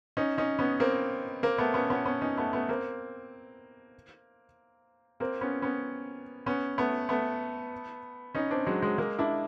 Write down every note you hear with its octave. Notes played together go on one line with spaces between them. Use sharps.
C#4 D#4
C#4 D#4
B3 C#4
A#3 C4
A#3 C4
A3 B3
B3 C#4
B3 C#4
B3 C#4
C#4 D#4
A3 B3
A3 B3
A#3 C4
A#3 C4
B3 C#4
B3 C#4
B3 C#4
A3 B3
A3 B3
C#4 D#4
C4 D4
F#3 G#3
F#3 G#3
G#3 A#3
D4 E4